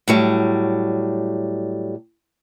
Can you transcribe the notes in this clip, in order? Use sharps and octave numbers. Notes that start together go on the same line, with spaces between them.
A2 F#3 G3